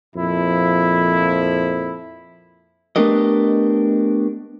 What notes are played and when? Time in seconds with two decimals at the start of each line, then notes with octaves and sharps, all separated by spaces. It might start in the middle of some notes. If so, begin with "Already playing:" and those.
0.16 F2 A#2 F3 E4
2.96 A3 B3 D4 G4 A#4 D#5